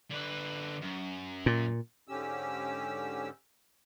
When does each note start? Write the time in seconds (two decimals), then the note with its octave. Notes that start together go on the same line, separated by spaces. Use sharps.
0.10 D3 B4
0.82 F#2
1.46 A#2
2.08 G#2 D3 C#4 G4 E6